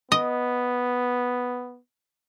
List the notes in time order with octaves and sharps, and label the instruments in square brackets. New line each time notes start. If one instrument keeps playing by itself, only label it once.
[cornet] B3 [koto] D#5